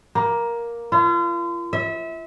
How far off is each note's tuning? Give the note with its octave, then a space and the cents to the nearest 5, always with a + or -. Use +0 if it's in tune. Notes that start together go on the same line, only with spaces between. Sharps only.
A#3 +10
F4 -40
E5 -25